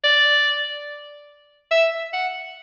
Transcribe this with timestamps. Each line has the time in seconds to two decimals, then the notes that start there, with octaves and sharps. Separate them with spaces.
0.04 D5
1.71 E5
2.13 F#5